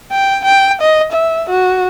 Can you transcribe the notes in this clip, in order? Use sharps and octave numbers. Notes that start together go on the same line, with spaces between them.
G5
G5
D#5
E5
F#4